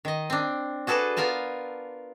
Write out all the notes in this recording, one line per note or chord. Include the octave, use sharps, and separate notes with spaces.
D#3 D#5
C4 D4
F#4 G#4 A4 B4 D5 A5
B3 F4 A#4 G#5 A5